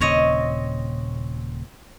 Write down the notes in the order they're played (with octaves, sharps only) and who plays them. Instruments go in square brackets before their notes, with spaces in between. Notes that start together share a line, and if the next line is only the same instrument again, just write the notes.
[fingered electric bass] D#1 A#2 C#3 [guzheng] C4 C#5 D#5